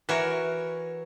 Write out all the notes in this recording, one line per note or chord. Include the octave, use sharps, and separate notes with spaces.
E3 F#4 A#4 C#5